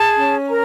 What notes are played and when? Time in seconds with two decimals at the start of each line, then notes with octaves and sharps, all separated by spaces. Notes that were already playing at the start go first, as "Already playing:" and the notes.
Already playing: G#4 A5
0.16 C#4
0.48 A#4 A#5